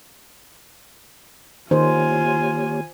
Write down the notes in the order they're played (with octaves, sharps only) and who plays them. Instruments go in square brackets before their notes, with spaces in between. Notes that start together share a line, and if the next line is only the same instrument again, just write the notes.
[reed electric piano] D#3 [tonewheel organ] A#3 G4 C#5 [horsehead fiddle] F4 G#5 [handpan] C5